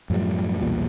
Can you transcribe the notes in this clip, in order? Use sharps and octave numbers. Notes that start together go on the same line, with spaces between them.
F#2 A2 F3 G3
B1 E2 A#2 G3